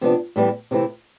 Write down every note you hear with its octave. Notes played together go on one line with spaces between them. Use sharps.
C3 F3 B3 D4
A2 E3 G3 B3 E4
C3 E3 A3 C4 E4